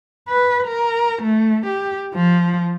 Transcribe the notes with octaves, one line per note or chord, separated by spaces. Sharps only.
B4
A#4
A3
G4
F3